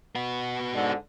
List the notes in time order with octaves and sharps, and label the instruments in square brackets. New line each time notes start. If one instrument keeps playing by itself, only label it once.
[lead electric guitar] B3 F#4
[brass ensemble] G#2 D3